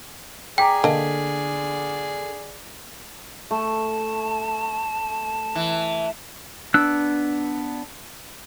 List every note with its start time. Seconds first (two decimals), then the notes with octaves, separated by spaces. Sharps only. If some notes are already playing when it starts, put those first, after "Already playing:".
0.58 G#4 D5 G5 A#5 D6 B6
0.84 D3 A#3 D#5 A5
3.51 A3 A5
5.55 E3
6.74 B3 D4 E6 F#6